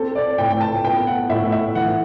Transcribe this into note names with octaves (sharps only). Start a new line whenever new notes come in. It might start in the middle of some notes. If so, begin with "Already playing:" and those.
Already playing: C4 A4
D5
A2 G5
G5
A5
B3 G5
F#5
A2 E5
E5
E3 F#5